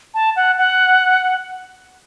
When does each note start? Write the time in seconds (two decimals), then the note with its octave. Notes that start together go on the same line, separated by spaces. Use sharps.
0.14 A5
0.36 F#5
0.58 F#5